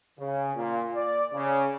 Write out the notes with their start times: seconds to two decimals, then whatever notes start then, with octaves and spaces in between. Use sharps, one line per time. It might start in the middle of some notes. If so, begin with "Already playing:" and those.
0.19 C#3
0.56 A#2
0.96 D5
1.33 C#3